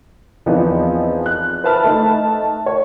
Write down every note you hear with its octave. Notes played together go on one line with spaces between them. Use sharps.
E2 E3 F3 B3 C4 D#4
F#6
B4 C5 E5 A5 B5 F6
A3 D#4 A5
C#5